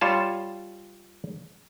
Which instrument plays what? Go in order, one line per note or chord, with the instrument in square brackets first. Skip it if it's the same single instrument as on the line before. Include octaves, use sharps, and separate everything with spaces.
[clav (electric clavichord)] G3 F4 C#5 A5